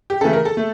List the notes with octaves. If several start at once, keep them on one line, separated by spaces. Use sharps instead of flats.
G4
C#3 E3 A3 A4
A#4
A4
A3